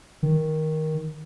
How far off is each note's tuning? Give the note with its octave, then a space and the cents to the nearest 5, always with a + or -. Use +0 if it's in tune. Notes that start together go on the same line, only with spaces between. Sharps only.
D#3 +10